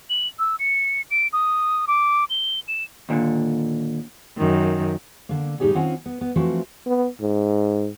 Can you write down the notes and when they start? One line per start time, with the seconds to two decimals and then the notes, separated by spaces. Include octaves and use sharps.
0.10 F#7
0.39 E6
0.59 C#7
1.11 D7
1.33 D#6
1.88 D6
2.30 G7
2.68 E7
3.09 D#2 A#2 D3
4.37 F#2 D#3
5.29 D3 A#3
5.60 A2 G3 B3 D#4 G4 G#4
5.75 D#3 C4 C#4 F4 F#5 G#5
6.06 B3
6.21 B3
6.36 E3 F3 A3 C4 F#4
6.86 B3
7.21 G#2